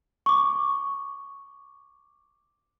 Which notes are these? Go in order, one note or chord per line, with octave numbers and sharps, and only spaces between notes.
C#6 D6